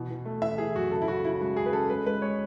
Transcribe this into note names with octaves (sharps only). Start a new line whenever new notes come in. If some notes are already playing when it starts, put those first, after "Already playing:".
Already playing: B2 E3
E3
A3
E3 E5
E3 G#4
F#2 F#4
C#3 A4
E4
C#3 F#4
C#3 E4
G#3 F#4
C#3 G#4
B4
C#4 A4
G#3 B4
G#3 B4
G#3 C#5